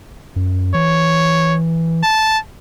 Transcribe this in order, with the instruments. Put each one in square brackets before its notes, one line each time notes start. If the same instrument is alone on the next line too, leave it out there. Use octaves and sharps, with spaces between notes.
[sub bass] F#2
[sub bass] E3 [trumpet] C#5
[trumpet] A5